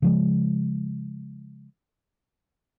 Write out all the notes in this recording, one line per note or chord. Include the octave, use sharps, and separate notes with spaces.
C#3 F3 G#3